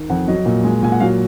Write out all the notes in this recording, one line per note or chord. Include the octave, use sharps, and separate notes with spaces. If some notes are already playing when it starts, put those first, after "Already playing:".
Already playing: D#3
F2 F#5
F#3 D#5
A#2
G#3
A#2 G#5
F#5
F#3 F5